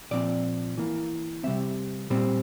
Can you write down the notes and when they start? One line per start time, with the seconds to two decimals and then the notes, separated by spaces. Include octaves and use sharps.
0.11 A#2 F3 C4 D5
0.78 E3 A#3
1.44 C3 G3 C4 E5
2.10 A#2 G3 C4